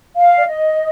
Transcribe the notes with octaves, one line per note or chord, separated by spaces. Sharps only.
F5
D5
D#5